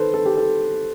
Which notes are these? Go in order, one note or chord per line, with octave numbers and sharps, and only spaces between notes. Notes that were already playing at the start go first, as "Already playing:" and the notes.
Already playing: D#3 A4 B4 C5
A4
G4
A4